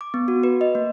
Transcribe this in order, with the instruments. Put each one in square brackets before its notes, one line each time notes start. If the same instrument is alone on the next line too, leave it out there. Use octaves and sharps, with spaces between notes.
[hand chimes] D6
B3
F#4
B4
D#5
A#3